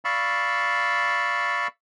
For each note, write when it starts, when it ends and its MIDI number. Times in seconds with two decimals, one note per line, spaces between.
0.05 1.67 74
0.05 1.67 77
0.05 1.67 83
0.05 1.67 85
0.05 1.67 88